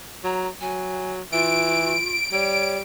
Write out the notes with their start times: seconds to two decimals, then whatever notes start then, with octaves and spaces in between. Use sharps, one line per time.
0.24 F#3 A#5
0.61 F#3 G#5
1.32 E3 F4 D7
2.32 G3 C#5